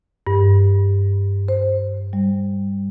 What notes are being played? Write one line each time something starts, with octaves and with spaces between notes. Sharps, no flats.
G2
C5
G3